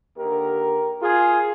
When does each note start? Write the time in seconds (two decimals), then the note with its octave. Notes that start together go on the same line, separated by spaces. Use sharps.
0.17 D#2 D3 G4 A#4
1.02 F4 G#4